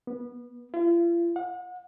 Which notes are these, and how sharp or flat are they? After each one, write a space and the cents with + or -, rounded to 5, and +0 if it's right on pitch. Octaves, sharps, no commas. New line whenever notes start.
B3 -20
F4 -40
F#5 -35